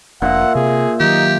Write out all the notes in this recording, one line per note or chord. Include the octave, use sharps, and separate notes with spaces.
F1 A#2 D4 E5 F#5
C3 G#4
D#3 F#3 D#4 G4